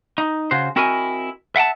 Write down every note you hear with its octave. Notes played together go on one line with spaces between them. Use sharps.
D#4
C#3 F#4 C5
C4 E4 F#4 A#4 D#5 G#5
E5 F#5 G5 A5